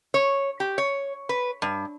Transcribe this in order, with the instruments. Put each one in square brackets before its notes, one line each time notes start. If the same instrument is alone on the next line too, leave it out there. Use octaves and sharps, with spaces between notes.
[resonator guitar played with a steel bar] C#5
G4
C#5
B4
G2